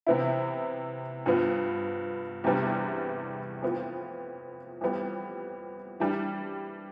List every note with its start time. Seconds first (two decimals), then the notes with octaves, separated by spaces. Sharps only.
0.07 C3 E3 B3 E4
1.26 G2 F3 B3
2.44 E2 C3 G3 B3 D4
3.62 F2 E3 B3 F4
4.81 F2 E3 G3 B3
6.00 E3 G3 D4